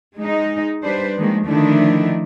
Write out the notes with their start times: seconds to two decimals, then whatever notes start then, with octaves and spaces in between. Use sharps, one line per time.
0.18 G#3 D#4
0.82 G3 D4 B4 C5
1.18 D#3 F3 G#3 A#3
1.47 D3 D#3 F3 A3 D4 E4